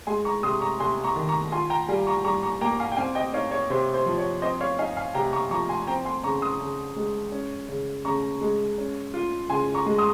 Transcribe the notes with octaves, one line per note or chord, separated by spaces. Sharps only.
G#3 G#5 C6
A#5 C#6
C3 C6 D#6
A#5 C#6
C3 G#5 C6
A#5 C#6
D#3
A#5 C#6
F4 G#5 C6
G5 A#5
G3 F5 G#5
A#5 C#6
G3 A#5 C#6
A#5 C#6
A#3 G5 A#5
F5 G#5
G5
C4 F5 G#5
D#5 G5
D#4 C#5 F5
C#5
C3 C5
C5
F3
C#5
C4 C5 D#5
C#5 F5
D#4 F5 G#5
F5 G#5
C3 G5 A#5
A#5 C#6
F3 A#5 C#6
G#5 C6
C4 G5 A#5
G#5 C6
C#3 A#5 C#6
C6 D#6
C#3
G#3
C#4
C#3
C#3 A#5 C#6
G#3
C#4
F4
C#3 G#5 C6
A#5 C#6
G#3
C6 D#6